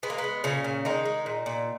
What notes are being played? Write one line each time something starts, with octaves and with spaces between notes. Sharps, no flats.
G#3 B3
A#3
B3
G#3
A#2 C#3 C#4
A#2
D#3 G#3 D#4
G#3
A#2
A#2